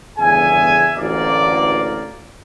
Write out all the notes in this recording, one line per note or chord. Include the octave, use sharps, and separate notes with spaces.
G1 E2 C#3 G#4 E5 G#5
A1 D2 A#3 D5